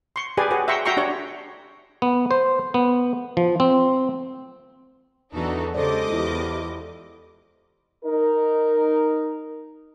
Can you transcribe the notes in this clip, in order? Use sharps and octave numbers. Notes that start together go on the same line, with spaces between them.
C6 C#6
G4 G#4 B4 D5 G#5
F#4 G#4 B4 C#5
E5 G5 A#5 C6 C#6
F#4 E5 G5 A#5 C6 C#6
D4 G4 C#5
B3
C5
B3
F3
C4
E2 E3 D4 D#4 F#4 A4
C#3 G#3 G4 A4 C5 D5 D#5 D6
E2 E4 F4
D#4 A#4